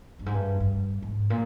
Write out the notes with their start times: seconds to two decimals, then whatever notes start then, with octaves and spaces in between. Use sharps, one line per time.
0.19 G2
0.26 G#2
0.34 G2
0.60 G2
1.02 G#2
1.30 A#2